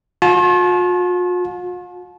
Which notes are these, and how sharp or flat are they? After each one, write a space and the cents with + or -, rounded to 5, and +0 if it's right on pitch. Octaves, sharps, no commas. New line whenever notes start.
F4 +45 A5 -30